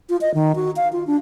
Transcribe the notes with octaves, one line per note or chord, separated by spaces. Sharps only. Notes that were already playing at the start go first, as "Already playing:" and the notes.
F4
D#5
D#3
F#4
F5
F4
D4